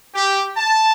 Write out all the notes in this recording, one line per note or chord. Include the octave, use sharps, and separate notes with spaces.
G4
A5